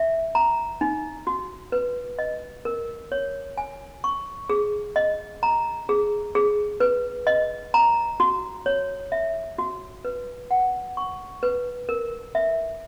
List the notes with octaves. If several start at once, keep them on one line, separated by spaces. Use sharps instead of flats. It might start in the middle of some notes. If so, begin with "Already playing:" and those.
Already playing: E5
A#5
D#4
F#4
B4
D#5
A#4
C#5
G#5
C#6
G#4
D#5
A#5
G#4
G#4
B4
D#5
A#5
F#4
C#5
E5
F#4
B4
F#5
C#6
B4
A#4
E5